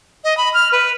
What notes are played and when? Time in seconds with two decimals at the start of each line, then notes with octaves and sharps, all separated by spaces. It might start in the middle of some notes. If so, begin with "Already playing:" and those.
0.24 D#5
0.37 B5
0.54 F6
0.72 B4